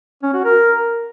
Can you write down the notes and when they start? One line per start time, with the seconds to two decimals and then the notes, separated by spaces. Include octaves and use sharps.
0.23 C#4
0.34 F#4
0.44 A#4